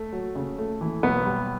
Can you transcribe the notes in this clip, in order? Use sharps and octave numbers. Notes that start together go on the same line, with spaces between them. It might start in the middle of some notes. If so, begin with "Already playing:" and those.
Already playing: A3
F#3
C#3
A3
E3
B1 B3
G3